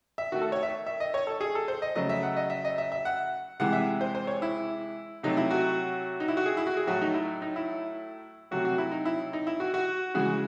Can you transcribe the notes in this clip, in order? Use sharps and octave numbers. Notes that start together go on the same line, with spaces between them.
E5
D#3 A3 F#4
A4
C#5
E5
E5
D#5
C#5
A4
G#4
A4
C5
D#5
C#3 F#3 A3 D#5
E5
F#5
D#5
E5
D#5
E5
E5
F#5
C3 E3 G#3 F#5
E5
C5
C5
C#5
E4
C3 F#3 A3 D#4
E4
F#4
D#4
E4
F#4
G#4
E4
F#4
G#4
A2 F#3 A3 F#4
D#4
E4
D#4
E4
C3 F#3 A3 F#4
F#4
E4
D#4
E4
D#4
E4
F#4
F#4
C#3 E3 G#3 F#4